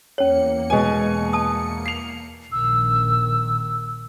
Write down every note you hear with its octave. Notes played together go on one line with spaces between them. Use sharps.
E2 A#3 C#4 C#5 C#7
B2 G#3 B3 G#5
A5 D#6
C7 F7
A#1 D#3 E6